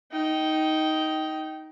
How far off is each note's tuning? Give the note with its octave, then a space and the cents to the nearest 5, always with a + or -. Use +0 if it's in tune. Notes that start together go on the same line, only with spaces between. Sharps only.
D#4 +10 G5 -15